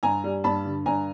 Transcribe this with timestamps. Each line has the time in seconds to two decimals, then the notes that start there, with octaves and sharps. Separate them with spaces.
0.03 G2 G#5 A#5
0.24 G3
0.44 G2 A5 B5
0.65 D3
0.86 G2 G#5 A#5